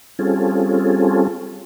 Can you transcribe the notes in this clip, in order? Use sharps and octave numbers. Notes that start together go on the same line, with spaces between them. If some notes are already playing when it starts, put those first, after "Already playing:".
G3 C4 C#4 F4 G#4 A4